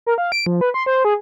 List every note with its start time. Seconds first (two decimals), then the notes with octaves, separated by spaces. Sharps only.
0.07 A#4
0.18 F5
0.32 D7
0.46 F3
0.61 B4
0.74 C6
0.86 C5
1.05 G#4